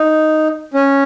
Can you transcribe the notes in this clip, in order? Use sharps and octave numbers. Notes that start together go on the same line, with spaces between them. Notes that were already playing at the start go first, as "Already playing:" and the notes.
Already playing: D#4
C#4